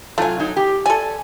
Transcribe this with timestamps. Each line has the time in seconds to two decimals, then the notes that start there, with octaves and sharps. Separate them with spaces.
0.18 C3 F#3 A3 F4 G#5
0.39 F#3 D#4
0.57 G4 G5
0.86 A4 D5 G#5